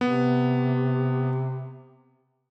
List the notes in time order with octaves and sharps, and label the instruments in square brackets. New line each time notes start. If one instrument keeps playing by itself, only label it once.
[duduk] C3 [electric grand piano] B3